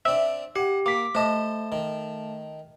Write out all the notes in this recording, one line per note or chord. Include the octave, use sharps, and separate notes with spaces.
C4 D4 E5
G4 F#5
A#3 D6 B6
A3 C5 D#5 A5
D#3